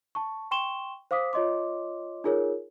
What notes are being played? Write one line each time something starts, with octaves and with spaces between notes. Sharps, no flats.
A5 C#6
G5 C6 C#6 E7 G7
C5 F5 D6 D#6 B6
F4 C#5 D#5 C6 D6
D#4 F4 G#4 A#4 C#5